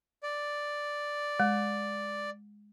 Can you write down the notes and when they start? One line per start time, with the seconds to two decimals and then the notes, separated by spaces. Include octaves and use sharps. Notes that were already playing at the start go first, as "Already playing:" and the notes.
0.23 D5
1.40 G#3